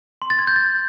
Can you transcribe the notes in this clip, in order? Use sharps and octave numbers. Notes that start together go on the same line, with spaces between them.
C6
A6
G#6
G6
A6